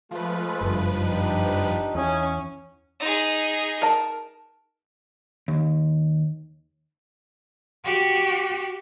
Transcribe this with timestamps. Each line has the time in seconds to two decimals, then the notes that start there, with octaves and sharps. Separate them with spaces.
0.11 F3 G#3 A3 F4 B4
0.61 F#1 G2
0.90 D4 D#4 G4
1.95 E2 C#4 D#4 G#5 D#6
3.00 D#4 G#4
3.82 A#4 A5
5.48 D#2
7.84 F#4 G4